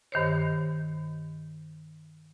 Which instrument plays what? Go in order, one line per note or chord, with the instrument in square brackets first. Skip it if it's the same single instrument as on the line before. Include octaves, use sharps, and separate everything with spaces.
[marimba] G2 D#3 C5 C#5